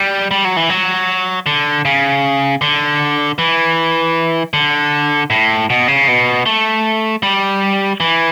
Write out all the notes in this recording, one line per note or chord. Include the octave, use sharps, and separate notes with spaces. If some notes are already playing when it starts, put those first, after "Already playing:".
Already playing: G3
G3
F#3
E3
F#3
D3
C#3
D3
E3
D3
A2
B2
C#3
B2
A3
G3
E3